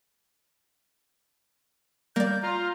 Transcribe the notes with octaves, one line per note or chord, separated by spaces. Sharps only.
G3 A#3 D5 G6
F4 A#5